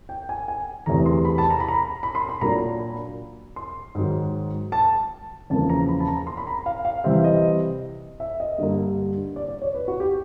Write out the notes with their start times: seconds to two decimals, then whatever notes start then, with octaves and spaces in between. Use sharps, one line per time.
0.09 G5
0.29 G#5
0.48 G#5
0.86 E2 C3 E3 A3 A#5
1.06 C6
1.25 B5
1.38 A5
1.51 A#5
1.60 B5
1.68 A#5
2.03 B5
2.15 C6
2.29 B5
2.41 A#2 F#3 A#3 D4 A#5
2.79 B5
3.56 C6
3.95 G#2 D#3 F#3
4.72 A5
5.50 E2 C#3 F3 A#3 A5
5.70 A#5
5.88 B5
6.00 A5
6.08 A#5
6.27 C6
6.37 B5
6.47 A#5
6.66 F5
6.85 F5
7.04 C3 E3 G3 C4 E5
7.24 D#5
8.20 E5
8.40 D#5
8.58 G2 D3 G3 A#3
9.36 D5
9.48 D5
9.62 C#5
9.75 B4
9.88 F#4
10.00 G4